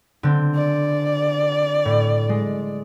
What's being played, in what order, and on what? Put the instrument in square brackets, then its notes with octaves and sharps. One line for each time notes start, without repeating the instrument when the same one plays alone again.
[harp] D3 C4
[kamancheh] D5
[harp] A2
G#3